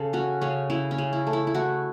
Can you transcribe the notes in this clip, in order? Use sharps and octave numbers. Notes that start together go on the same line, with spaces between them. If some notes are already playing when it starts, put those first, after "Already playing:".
Already playing: C#3 A4
C#4 F#4
C#3 C#4
C#3 E4
C#4
C#3
E4
A3
E4
E4
A3 F#4